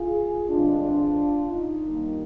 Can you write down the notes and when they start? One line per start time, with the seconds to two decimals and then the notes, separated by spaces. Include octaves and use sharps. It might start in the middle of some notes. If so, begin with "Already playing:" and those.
Already playing: F4 G#4
0.49 G2 D3 G#3 C4 D4 F4
1.50 D#4
1.84 D#2 D#3 G3 A#3